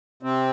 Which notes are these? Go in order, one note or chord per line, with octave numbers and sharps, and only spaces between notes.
C3 C4